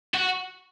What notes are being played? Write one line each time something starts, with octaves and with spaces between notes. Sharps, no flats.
F#4